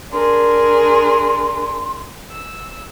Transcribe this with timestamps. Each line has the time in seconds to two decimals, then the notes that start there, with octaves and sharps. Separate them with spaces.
0.12 D4 G#4 A#4 C6
2.32 E6